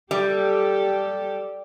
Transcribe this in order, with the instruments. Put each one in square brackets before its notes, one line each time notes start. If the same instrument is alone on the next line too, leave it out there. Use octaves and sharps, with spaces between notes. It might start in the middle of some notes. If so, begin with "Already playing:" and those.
[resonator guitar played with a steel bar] G3 [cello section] G4 A4